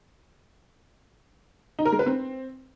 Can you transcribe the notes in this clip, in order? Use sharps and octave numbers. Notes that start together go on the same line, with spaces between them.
D#4
A#4
G#3
B4
C4